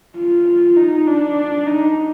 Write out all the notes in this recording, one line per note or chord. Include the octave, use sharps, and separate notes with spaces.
F4
D#4
D4
D#4